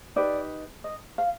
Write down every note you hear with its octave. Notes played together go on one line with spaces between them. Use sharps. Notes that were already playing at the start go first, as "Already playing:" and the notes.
D#4 G4 B4 D5
D#5
F5